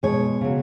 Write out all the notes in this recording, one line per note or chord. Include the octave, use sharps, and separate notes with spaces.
B2 G#3 C#5
C#3 F#3